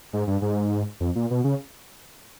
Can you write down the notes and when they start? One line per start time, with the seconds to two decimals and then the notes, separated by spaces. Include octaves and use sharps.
0.13 G#2
0.27 G2
0.42 G#2
1.00 F2
1.16 A#2
1.31 B2
1.44 C#3